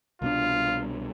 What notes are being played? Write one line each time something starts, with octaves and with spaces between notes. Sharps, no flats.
C2 B2 D4 F4